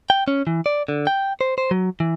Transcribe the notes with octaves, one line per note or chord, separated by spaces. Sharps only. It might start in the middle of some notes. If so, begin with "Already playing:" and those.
G5
C#4
E3
D5
D3
G5
C5
C5
F#3
E3